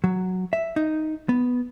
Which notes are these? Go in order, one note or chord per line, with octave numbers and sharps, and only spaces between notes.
F#3
E5
D#4
B3